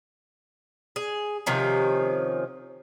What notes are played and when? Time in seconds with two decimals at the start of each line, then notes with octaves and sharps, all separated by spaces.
0.96 G#4
1.46 C3 D#3 F3 C#4